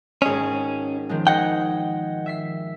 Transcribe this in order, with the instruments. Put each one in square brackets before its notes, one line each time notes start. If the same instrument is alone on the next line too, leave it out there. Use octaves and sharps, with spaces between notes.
[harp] G#1 D#5 [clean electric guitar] C#4 G#4
[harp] D#3 F3 G#3
[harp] G#4 [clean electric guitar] D#5 F#5 G5
[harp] E5 B6 C7